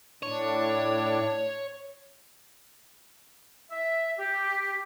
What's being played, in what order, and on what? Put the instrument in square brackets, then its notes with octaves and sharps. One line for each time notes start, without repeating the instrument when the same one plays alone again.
[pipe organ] A2 D4 [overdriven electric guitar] C#5
[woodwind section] E5
G4